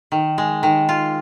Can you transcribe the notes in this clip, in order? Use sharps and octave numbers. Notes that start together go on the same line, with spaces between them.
D#3
G#3
D#3
F4